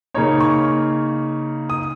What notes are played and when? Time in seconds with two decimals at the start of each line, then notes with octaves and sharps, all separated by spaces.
0.14 C#3 A#3 D#4 C#5
0.40 C#6
1.70 D#6